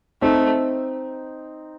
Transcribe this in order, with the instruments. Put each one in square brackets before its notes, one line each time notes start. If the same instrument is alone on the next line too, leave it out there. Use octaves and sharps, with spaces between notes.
[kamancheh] A3 [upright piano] C4 D#4